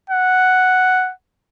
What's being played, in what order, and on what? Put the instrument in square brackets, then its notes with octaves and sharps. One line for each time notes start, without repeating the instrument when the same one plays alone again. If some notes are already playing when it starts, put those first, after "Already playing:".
[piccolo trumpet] F#5